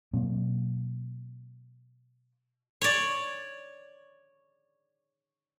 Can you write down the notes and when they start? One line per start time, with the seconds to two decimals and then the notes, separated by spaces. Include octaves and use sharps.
0.13 B2 F#3 A#3 C4
2.81 C#5 D5